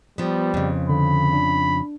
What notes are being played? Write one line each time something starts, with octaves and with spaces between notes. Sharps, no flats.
F3 G3 B3
F2 C#3
D3 B5
D4